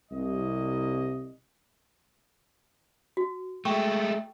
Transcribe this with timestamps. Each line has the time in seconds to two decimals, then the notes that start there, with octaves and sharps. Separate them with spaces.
0.11 C2 D#5
3.17 F#4
3.65 G#3 A3 G5 C#6